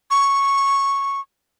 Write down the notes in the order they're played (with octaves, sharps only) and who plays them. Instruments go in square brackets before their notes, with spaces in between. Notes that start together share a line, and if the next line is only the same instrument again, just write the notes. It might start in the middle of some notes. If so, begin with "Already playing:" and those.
[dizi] C#6